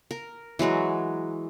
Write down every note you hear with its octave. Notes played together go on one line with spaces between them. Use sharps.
A#4
E3 F#3 G#3 F#4